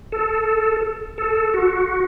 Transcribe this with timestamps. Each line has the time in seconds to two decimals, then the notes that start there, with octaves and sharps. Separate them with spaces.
0.12 A4
1.18 A4
1.54 F#4